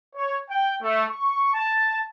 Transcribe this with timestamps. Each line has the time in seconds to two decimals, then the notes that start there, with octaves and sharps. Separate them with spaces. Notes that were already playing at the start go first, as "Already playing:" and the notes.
0.16 C#5
0.50 G5
0.81 A3
1.10 C#6
1.54 A5